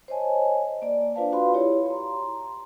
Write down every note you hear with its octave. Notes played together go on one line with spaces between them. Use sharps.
C5 C#5 D#5 G#5 A5
A#3 D5
D4 F4 B4 C5 F5 A5
F4 F#4 B4 F5 B5 C6
E4 G4 C#5
A#5 C6